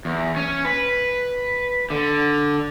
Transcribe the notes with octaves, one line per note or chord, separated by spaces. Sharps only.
E2
C#4
B4
D3